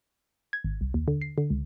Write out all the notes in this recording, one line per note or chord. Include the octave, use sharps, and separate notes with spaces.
G#6
G#1
C2
D#2
D3
C7
D3
C#2